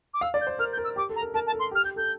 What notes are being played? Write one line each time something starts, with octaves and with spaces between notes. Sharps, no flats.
D6
F5 E6
D5
G6
C5
A#4 F6
G6
A#4
E6
G4 D6
A4
A#5
A#4
A#4 A5
A5
A4
C6
G4
F6
G4 G6
A4 G6